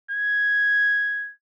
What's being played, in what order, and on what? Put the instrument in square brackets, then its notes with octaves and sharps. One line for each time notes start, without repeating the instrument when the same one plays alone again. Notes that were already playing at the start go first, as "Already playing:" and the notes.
[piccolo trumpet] G#6